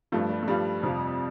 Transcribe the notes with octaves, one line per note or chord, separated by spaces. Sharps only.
G2 F3 A3
G3
A3
G2 F3 G3
F2 C3 F3